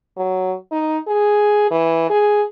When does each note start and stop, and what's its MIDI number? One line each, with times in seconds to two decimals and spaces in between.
0.17 0.55 54
0.72 0.98 63
1.08 1.68 68
1.71 2.10 52
2.10 2.43 68